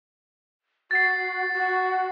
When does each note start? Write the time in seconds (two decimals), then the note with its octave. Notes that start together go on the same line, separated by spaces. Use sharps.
0.91 F#4 A6 C7
1.53 F#4